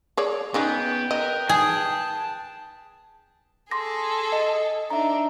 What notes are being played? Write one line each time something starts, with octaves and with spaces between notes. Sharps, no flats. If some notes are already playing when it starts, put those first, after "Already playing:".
G#4 C#5 D5
C#3 B3 D#4 G#4 B4 G5
A#4 D#5
G#4 A5
G#4 A4 C6 D6 A#6
D#5
D4 D#4 E5 A#5